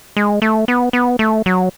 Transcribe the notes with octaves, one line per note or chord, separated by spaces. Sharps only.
G#3
A3
B3
B3
A3
F#3